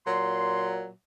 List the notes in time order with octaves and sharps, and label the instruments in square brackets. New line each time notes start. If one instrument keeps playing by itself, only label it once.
[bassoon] A#2 [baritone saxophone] F#3 [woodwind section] C6